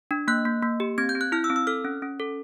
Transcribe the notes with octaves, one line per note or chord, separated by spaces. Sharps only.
D4
A#3 F#6
A#3
A#3
G4
C4 G#6
G6
C4
F#6
E4 F6
E6
C4
E6
A4 F6
C#4
C#4
A4